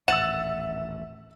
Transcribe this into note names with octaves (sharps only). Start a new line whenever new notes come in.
D#1 A1 E5 F#5 E6 A6 E7